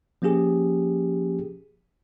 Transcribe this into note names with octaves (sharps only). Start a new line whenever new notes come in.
F3 A#3 C#4 G4 G#4